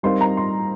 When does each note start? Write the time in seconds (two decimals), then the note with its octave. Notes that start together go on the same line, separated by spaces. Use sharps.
0.03 G3 C4 D#4 A#4 F5 C6
0.21 A#5
0.37 C6